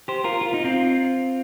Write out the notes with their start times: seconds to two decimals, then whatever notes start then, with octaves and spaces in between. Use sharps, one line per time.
0.08 G4 C5
0.24 F4 A#4
0.41 F4
0.54 D#4
0.65 C4 F4